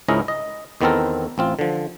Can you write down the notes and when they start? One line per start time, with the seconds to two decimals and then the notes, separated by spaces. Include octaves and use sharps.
0.08 C#2 G#2 C#4 E4 A#4 D#5
0.28 D#5
0.81 E2 D#3 B3 C4 A4 A#4
1.38 A1 C4 F4
1.59 D3 F3